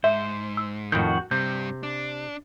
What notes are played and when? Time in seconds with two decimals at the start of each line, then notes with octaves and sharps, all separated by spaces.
0.04 G#2 C5 E5
0.57 E6
0.92 F2 A2 D#3 F#4 G6
1.31 G2 C3 G3 G6
1.83 D4